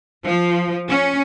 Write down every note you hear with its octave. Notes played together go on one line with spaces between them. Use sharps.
F3
C#4